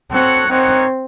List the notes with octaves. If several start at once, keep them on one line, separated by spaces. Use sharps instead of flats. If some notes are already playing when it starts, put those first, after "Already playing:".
C4 F#4 A4 C#5 F#5
C4 D#4 A#4 C#5 F#5